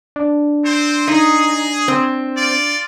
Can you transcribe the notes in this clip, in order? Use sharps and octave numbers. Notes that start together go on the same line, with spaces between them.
D4
C4 C5
D#4 G#4
C4
F4 D5